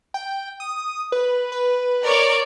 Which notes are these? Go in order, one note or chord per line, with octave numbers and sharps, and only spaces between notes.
G5
D#6
B4
B4
A#4 C#5 D5